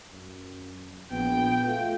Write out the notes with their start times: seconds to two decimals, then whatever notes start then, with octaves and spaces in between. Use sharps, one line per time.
0.13 F#2
1.11 A#1 B3 G5
1.65 A3 F4